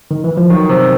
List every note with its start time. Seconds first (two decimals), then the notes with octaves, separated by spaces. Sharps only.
0.11 D#3
0.24 E3
0.37 F3
0.50 D#3 F#3
0.69 C3